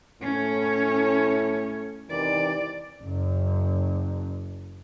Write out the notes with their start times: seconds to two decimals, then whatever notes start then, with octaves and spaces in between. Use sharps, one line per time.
0.21 A2 C#4 C#5
2.10 C3 D#3 E3 D5
3.03 F#1 F#2